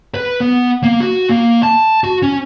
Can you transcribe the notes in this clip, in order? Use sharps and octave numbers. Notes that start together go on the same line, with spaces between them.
B4
B3
A#3
F#4
A#3
A5
F#4
C#4